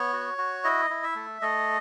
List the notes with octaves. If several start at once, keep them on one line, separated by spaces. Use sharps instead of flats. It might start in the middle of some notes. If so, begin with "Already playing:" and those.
Already playing: B3 C#5
F#4
F#4
E4 D#5
E4
E5
A3
A3 D#5